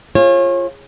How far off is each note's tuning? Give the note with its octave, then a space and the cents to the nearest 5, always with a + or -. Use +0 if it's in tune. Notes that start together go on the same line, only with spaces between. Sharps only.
F4 -10 G#4 -15 C#5 -35